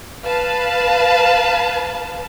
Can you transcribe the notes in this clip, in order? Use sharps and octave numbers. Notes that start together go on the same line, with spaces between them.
B4 F5 A5